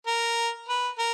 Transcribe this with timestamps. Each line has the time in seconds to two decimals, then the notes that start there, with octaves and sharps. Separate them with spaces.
0.07 A#4
0.69 B4
0.98 A#4